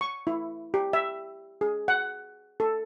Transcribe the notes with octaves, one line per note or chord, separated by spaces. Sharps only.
C#6
E4
G4
E5
G#4
F#5
A4